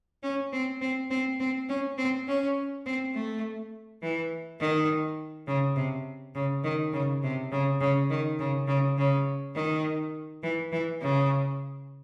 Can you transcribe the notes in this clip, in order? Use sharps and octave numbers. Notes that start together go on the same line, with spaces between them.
C#4
C4
C4
C4
C4
C#4
C4
C#4
C4
A3
E3
D#3
C#3
C3
C#3
D#3
C#3
C3
C#3
C#3
D#3
C#3
C#3
C#3
D#3
E3
E3
C#3